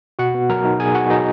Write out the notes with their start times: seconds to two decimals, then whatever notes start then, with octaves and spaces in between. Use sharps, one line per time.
0.19 B2 F#4 F#5
0.35 B3
0.49 F#3 A#4 A#5
0.65 D#4
0.79 B2 G#4 G#5
0.95 B3 F#4 F#5
1.10 F#3 D#4 D#5